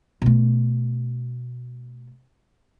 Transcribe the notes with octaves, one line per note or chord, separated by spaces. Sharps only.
B2 A3